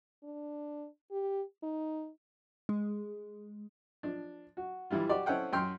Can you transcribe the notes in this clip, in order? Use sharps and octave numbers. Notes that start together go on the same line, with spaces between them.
D4
G4
D#4
G#3
F3 D4
F#4
E3 G3 E4 F4
F#4 G4 D5
C4 C#4 E4 A4 F#5 G5
F#2 G5 C6 F6